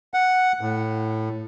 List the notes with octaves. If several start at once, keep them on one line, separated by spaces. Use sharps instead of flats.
F#5
A2